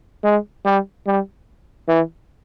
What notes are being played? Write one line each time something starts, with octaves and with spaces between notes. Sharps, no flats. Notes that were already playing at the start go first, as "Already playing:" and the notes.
G#3
G3
G3
E3